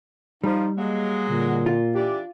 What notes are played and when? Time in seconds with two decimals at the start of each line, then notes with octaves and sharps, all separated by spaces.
0.44 F3 G3 D#4
0.78 F#3 G#3 A#3
1.29 A#2 D3
1.66 F4
1.95 E3 D4 G4 D5